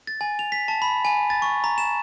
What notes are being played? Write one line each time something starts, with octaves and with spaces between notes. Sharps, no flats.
A6
G#5
F7
B6
A5
B5
G#5
A6
C#6
A#5
E7